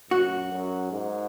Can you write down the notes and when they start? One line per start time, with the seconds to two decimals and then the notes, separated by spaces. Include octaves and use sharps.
0.11 F#2 F#4
0.52 F#2
0.92 G#2